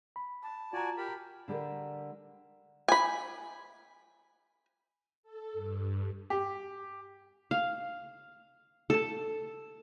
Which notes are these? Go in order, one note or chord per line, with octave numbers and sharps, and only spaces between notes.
B5
A5
F4 F#4 D5 G#5 A#5
G4 A#4 B5
D3 G3 G4 A4 A#4
G#5 B5
A4
G2
G4
F5
A4 A5